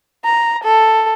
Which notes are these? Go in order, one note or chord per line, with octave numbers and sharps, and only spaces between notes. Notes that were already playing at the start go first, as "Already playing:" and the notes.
A#5
A4